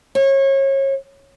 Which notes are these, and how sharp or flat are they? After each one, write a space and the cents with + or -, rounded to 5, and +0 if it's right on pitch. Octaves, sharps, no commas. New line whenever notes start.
C#5 -30